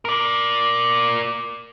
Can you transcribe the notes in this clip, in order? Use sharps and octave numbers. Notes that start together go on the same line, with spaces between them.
A#4 D5